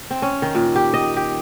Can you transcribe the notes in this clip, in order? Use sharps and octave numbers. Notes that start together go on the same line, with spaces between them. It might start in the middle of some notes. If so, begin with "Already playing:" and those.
C4
C#4
D#3
A#2
G4
D#5
G4